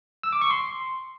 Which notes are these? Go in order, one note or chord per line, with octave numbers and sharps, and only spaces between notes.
E6
D6
C#6
C6